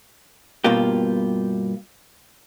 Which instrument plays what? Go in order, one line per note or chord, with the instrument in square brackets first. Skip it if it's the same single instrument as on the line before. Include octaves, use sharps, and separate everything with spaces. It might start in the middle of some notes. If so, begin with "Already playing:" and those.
[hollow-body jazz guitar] G2 B2 A#3 F4 G4